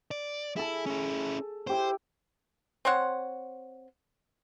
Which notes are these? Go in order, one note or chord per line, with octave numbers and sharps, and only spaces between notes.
D5
E4 G#4 A4
C#4 E4
E4 G4 C5 D6
C4 C5 C#5 F#5